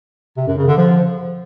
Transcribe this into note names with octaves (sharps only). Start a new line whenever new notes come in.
C3
F#2
C#3
D3
F3